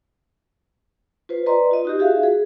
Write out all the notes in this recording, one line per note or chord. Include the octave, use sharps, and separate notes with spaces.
F4 B4 C5
B4 D5 D#5 A#5 C6
F4 D#5
D#4 F#4 G4
F4 F#4 G#4 E5 F5
G#4